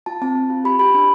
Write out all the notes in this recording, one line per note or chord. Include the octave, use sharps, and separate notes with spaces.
F4 A5
C4 A5
C4
F4
G4 B5
G4 B5
D4 B5